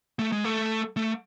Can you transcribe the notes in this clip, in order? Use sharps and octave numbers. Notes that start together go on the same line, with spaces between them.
A3
G#3
A3
A3